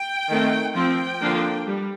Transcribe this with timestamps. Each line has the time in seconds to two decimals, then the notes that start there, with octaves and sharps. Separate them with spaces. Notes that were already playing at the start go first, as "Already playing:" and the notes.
Already playing: G5
0.29 D#3 A3 C4
0.75 F3 C4 G5
1.21 D3 F3 A#3 D4
1.66 G3